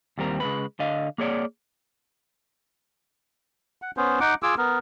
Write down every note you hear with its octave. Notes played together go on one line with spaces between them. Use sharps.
D#2 G3 C4 A#4
C#3 G#3 B4
D3 D#5 F5
A#3 G#4 C#5 D5
F#5
B3 C#4 C5
D#4 F#5 D6
F4 G#4 D6 E6
B3 A#4